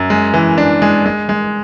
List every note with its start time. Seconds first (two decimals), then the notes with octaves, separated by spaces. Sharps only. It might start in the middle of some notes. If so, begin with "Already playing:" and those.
Already playing: F#2
0.10 G#3
0.34 E3
0.58 D4
0.82 G#3
1.06 G#3
1.29 G#3